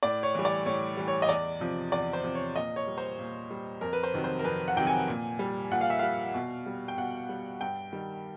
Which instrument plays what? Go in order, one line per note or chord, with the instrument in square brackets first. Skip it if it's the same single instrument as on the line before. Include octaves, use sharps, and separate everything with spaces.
[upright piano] A2 D5
C#5
E3 G3
D5
A2 C#5
E3 G3
C#5
D#5
E2 D5
C3 F3
E2 D5
C5
C3 F3
C#5
A#2 D#5
C#5
G3
C5
A#2
G3
F2 A#4
B4
C5
C3 D#3 F#3
C5
A#4
F2 B4
F#5
C3 D#3 F#3 G5
G#5
A#2
G3
A#2 F#5
F5
E5
G3 F5
B2
G3
G5
B2 F#5
G3
G2 G5
D#3 G3